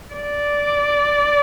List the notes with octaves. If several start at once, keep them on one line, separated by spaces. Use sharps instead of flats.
D5